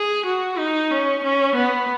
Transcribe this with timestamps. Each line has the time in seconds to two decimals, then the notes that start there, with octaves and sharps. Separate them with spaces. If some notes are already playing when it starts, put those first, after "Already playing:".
Already playing: G#4
0.26 F#4
0.58 D#4
0.91 C#4
1.24 C#4
1.55 B3